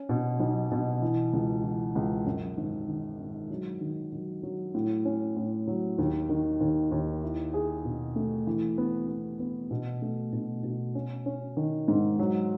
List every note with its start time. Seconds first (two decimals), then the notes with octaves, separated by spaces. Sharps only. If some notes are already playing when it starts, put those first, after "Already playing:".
Already playing: C#4
0.09 B2
0.40 B1
0.71 B2
1.02 E3
1.33 C#2
1.64 E3
1.95 C#2
2.26 F#2
2.57 G#1
2.88 D#3
3.20 G#1
3.51 F#3
3.81 D#3
4.12 F#3
4.43 F#3
4.74 A2
5.05 C#4
5.36 A2
5.68 F#3
5.98 D#2
6.29 D#3
6.61 D#2
6.92 D#2
7.23 E4
7.54 G#4
7.85 B2
8.16 A3
8.47 E3
8.78 B3
9.08 B3
9.39 B3
9.71 B2
10.02 A3
10.33 B2
10.64 B2
10.95 C#4
11.26 C#4
11.57 D#3
11.88 G#2
12.19 F#3